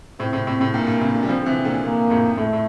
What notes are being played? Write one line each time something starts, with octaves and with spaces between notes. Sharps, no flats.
A2 C3 C4
A2 C3
A2 C3
A2 C3
G2 A#2 A#3
G2 A#2
A2 C3
A#2 D3
G3
D3 F3 C4
D3
C3 E3
C3
A#2 D3
A#3
F2 A2
A2 A3
A2